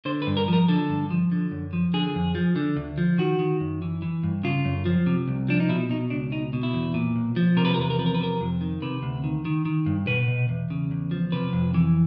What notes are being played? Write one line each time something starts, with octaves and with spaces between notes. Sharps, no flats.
D3 C5
B4
G2
A#4
F3 A#4
D3 A4
G2
F3
D3
F#2
F3
D3 G#4
F2
F3
D3
D2
F3
D#3 F#4
D#3
F#2
E3
E3
G2
C#3 F4
F#2
F3
C3
C2
F3 D4
D#4
B2 E4
B2 D#4
C#2 D4
B2 D#4
B2
E4
E2
A#2
B1
F3
C3 A#4
B4
A#4
E2 B4
A#4
F3 B4
A#4
B4
C3 A#4
F2
D#3
C3 B4
D2
D#3
D#3
D#3
G2
B2 B4
B2
E2
C#3
E2
F3
C3 B4
F2
E3